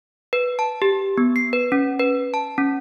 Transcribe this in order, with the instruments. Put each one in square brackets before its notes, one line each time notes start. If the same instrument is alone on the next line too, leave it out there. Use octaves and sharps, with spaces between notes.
[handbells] B4
A5
G4
B3
C7
B4
C#4
B4
A5
C#4